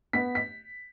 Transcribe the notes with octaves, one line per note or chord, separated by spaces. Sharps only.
B3 B6
B6